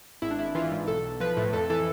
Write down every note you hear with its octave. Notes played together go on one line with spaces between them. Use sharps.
G#1 E4
D4
G#1 E4
E3 F4
G#2
B1 A4
B1
F3 B4
A2
F2 A4
E3 A4